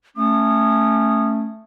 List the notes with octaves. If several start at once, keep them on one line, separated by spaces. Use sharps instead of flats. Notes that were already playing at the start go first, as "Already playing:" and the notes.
A3 C#4 D#6